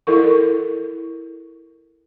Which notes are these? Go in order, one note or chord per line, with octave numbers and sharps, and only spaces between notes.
E4 A4 A#4 C#6